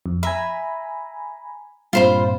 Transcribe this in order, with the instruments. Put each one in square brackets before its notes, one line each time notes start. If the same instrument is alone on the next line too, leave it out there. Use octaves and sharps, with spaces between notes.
[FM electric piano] F2
[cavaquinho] E5 [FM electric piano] G#5 A#5 B5
[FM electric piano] G2 A#2 C4 [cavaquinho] F4 C5 B5